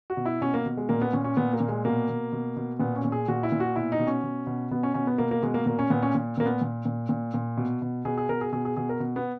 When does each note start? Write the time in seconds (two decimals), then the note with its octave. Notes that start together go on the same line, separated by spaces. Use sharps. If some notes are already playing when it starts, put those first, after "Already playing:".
0.10 F#4
0.17 B2
0.25 E4
0.41 B2 C#4
0.54 A#3
0.66 B2
0.77 G#3
0.89 A#2 A#3
1.01 B3
1.13 A#2 C#4
1.24 C#4
1.37 A#2 B3
1.53 A#3
1.60 A#2
1.69 G#3
1.85 B2 A#3
2.09 B2
2.33 B2
2.57 B2
2.80 A#2 B3
2.96 C#4
3.04 A#2
3.12 G#4
3.28 A#2 F#4
3.43 E4
3.52 A#2
3.60 F#4
3.76 B2 E4
3.92 D#4
3.99 B2
4.07 C#4
4.23 B2
4.47 B2
4.71 B2 B3
4.83 C#4
4.94 B2 C#4
5.07 B3
5.18 B2 A#3
5.31 A#3
5.43 B2 G#3
5.54 A#3
5.66 A#2 A#3
5.79 C#4
5.90 A#2 B3
6.02 C#4
6.15 A#2
6.38 A#2 A#3
6.46 B3
6.61 A#2
6.86 A#2
7.09 A#2
7.34 A#2
7.57 B2
7.82 B2
8.05 B2 G#4
8.18 G#4
8.29 B2 A#4
8.41 G#4
8.52 B2 G#4
8.65 G#4
8.77 B2 G#4
8.89 A#4
9.00 B2
9.16 B3